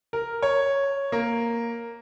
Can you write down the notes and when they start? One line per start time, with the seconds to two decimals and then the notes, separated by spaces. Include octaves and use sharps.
0.13 A#4
0.42 C#5
1.12 A#3